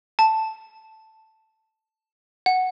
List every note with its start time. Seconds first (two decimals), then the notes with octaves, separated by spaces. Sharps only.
0.19 A5
2.46 F#5